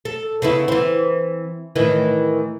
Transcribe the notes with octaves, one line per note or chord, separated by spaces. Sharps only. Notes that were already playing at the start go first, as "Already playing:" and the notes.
A4
C#3 B3 E4
E3 C4
A2 D#3 E3